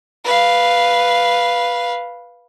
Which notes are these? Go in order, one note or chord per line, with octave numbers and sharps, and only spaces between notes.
B4 F5